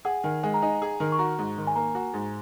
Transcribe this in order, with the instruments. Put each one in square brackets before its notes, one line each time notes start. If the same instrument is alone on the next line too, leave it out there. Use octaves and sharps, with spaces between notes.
[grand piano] G#4 [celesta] F#5
[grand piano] D#3 [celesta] G#5
[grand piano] G#3 [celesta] G#5
[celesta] A#5
[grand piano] D#4 [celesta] G#5
[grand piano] G#4
D#3
[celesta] C#6
[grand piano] F#4 [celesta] A#5
[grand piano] G#2
D#3
[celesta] G#5
[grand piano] A#3 [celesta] A#5
[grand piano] F#4
G#2